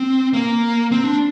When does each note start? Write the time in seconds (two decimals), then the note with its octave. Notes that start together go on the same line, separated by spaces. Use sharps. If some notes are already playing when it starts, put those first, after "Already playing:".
Already playing: C4
0.33 A#3
0.92 C4
1.04 D4